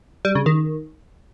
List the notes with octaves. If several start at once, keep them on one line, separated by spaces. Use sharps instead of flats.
G3
C#3
D#3